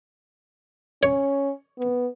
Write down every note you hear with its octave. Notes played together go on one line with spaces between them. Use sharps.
C#4 C#5
B3